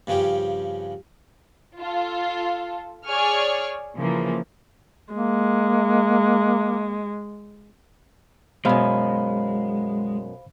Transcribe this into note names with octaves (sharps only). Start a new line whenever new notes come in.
G2 C#3 F3 C#4 G4
F4 A4
G#4 C#5 D5 G#5 C#6 F6
C#3 E3 F3 A#3
G#3 A#3
F#2 B2 G#3 C5 F5 B5